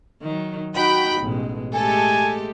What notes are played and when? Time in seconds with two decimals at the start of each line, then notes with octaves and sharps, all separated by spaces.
0.22 D#3 F#3
0.75 D#4 F#4 G5 B5
1.21 A1 B2 G#3
1.75 G#3 A3 G4 A4 G#5